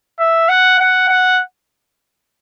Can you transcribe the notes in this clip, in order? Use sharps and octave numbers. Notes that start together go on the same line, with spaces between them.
E5
F#5
F#5
F#5